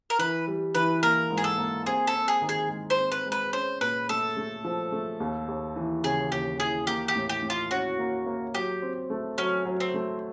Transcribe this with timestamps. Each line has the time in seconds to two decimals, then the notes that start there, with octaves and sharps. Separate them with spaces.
0.10 A#4
0.19 E3 B4
0.48 G3
0.75 E3 B4
1.03 A#3 A#4
1.30 G#2
1.37 G#4
1.44 A4
1.58 A#3
1.86 C4 G#4
2.07 A4
2.14 C4
2.28 G#4
2.42 D#3
2.49 G#4
2.69 G#3
2.90 C5
2.97 C4
3.12 B4
3.26 G#3
3.32 B4
3.53 C#4 C5
3.81 A#2 B4
4.09 A3 A4
4.37 A3
4.65 F3
4.92 A3
5.20 D#2
5.48 D#2
5.76 E3
6.03 C#3 G#4
6.32 D#2 G4
6.59 E3 G#4
6.87 A#3 G4
7.08 G4
7.15 A2
7.29 G4
7.42 A2
7.50 F4
7.71 C#4 F#4
7.99 A#3
8.26 A#3
8.54 F#3 G4
8.82 C4
9.10 A3
9.38 F#3 C#4
9.65 F#3
9.80 C4
9.94 A3